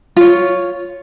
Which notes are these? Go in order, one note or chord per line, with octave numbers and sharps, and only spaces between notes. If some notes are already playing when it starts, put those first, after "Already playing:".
F4 C#5